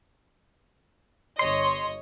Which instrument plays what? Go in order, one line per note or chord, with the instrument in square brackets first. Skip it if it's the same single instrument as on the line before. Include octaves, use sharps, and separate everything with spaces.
[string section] G1 C#5 D#5 [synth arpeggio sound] C6